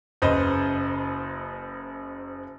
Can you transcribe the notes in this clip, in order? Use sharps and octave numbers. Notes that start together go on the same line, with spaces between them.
F#1 C#3 B4 C5 D#5